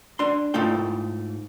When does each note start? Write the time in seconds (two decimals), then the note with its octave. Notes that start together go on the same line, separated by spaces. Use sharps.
0.19 D4 C6
0.54 G#2 A3 E4 F4 G5